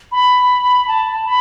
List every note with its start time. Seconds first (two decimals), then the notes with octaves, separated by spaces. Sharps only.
0.12 B5
0.88 A5
1.25 B5